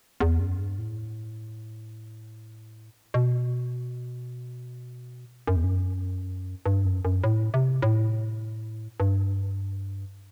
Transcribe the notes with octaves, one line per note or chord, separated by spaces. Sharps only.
E2
F#2
G2
A2
B2
F#2
E2
F#2
G2
F#2
F#2
A2
C3
A2
G2